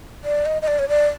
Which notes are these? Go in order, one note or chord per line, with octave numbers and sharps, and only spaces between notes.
D5
D#5
D#5
D5
C#5
D5